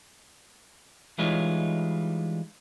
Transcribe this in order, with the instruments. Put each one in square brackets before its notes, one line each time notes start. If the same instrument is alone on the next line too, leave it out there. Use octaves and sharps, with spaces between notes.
[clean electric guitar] E3 G3 G#3 D#4 F4 C#5